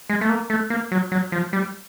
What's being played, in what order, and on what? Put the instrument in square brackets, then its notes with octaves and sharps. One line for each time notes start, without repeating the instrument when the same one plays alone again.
[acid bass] G#3
A3
A#3
A3
A#3
F#3
F#3
F3
G3